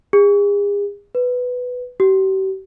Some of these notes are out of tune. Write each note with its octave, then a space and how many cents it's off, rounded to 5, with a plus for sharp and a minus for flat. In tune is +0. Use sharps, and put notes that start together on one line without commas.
G#4 -40
B4 +5
G4 -40